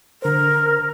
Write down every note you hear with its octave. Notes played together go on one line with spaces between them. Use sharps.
D3 A#4 C5